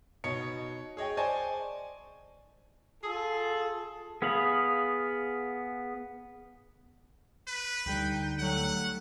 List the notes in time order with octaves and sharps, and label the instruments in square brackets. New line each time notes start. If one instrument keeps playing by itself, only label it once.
[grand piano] B2 D#4 C#5 C#7
G#4 C#5 D#5 G5
C5 D5 D#5 G#5 A5 C#6
[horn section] F4 G#4 A4
[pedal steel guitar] B3 G#4 F5 B5
[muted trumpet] B4
[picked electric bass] D2 D3 G3 [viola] D#4 G5
[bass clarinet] F#3 [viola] A3 [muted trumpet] F#5